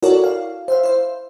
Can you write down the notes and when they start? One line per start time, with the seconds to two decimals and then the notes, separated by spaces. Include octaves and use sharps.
0.03 E4 F#4 A4 A#4 C#5 D5
0.24 F5
0.68 C5 E5 F5
0.83 E4 C5